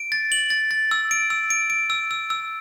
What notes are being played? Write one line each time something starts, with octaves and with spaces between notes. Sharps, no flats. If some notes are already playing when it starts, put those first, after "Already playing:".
Already playing: D7
A6
F#7
A6
A6
E6
D7
E6
D7
D7
E6
E6
E6